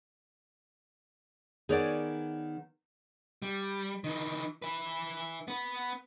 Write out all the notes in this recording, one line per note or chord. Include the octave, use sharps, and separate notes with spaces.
D#3 B3 G#4 C#5 D5
G3
D#3 E3
E4 B4
B3 B4